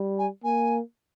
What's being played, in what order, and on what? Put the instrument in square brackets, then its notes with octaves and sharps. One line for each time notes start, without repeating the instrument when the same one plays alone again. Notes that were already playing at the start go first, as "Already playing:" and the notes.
Already playing: [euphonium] G3
[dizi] G#5
[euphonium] A#3 [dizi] G#5